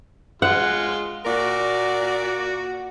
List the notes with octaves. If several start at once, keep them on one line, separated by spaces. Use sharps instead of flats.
G#3 F4 F#5
A#2 F#4 A#4 D5